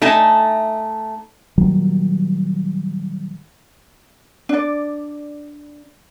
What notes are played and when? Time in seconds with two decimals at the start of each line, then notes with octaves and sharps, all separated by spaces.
0.01 A3 D#4 E5 G#5 A5
1.58 A#2 D#3 F#3 G3
4.49 D4 D5